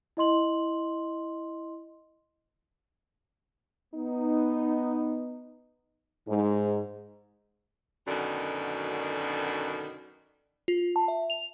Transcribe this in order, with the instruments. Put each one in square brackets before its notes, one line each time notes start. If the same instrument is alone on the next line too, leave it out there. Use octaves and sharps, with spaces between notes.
[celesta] E4 D#5 C6 F#7
[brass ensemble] B3 D#4
[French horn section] G#2
[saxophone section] F#2 B2 D3 D#3
[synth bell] F4
A5
E5
F7